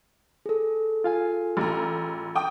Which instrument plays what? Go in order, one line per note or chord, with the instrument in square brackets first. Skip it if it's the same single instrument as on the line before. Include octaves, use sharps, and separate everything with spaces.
[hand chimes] G#4 A4
[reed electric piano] F4 F5 G#5
[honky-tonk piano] A1 A#5
G5 D#6